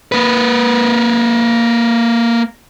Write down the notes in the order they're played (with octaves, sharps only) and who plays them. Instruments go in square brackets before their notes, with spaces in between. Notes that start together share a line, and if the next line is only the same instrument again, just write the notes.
[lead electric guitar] A#3 B4